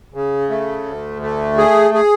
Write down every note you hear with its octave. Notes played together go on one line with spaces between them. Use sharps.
C#3
A3
D2
A3
G#4
G#4